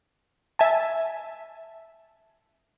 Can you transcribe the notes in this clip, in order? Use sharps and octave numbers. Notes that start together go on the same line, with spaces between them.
E5 G#5 A5